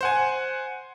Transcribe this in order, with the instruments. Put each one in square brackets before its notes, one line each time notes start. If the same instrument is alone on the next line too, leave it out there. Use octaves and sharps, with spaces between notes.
[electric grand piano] C5 F#5 G#5